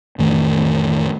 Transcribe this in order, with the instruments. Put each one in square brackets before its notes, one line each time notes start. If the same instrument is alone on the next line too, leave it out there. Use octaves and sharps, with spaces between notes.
[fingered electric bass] A1 F2 D#3 A3